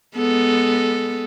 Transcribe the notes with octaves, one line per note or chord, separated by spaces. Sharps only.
G#3 B3 A4